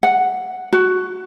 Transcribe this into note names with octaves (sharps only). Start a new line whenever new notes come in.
F#5
F#4